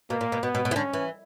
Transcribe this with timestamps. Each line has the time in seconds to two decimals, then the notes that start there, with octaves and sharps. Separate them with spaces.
0.10 B2 A#3
0.21 A#2
0.32 B2
0.43 B2 B3
0.55 B2
0.65 B2
0.71 E3
0.76 D3 C#4
0.93 E3